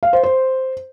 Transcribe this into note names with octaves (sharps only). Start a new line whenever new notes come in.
F5
C5
C5